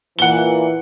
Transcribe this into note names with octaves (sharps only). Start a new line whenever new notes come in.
A#2 E3 F#5 G7